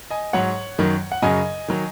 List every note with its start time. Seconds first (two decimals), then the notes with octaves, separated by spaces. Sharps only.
0.11 D#5 G#5
0.33 G#2 F#3 C#5 F#5
0.78 F#2 D#3 F#3
1.12 F#5
1.22 F#2 C#3 F#3 D#5 G#5
1.68 D#3 F#3